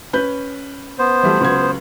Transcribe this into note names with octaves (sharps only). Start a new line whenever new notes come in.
C#4 B4 G6
B3 C5
E3 G3 A3
C#2 F#3 G#6